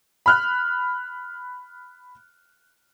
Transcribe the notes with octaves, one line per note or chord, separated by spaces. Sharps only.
B5 F6 F#6